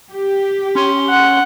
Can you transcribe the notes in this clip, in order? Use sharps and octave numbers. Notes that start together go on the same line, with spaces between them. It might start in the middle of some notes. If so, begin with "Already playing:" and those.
G4
C#4 C6
F#5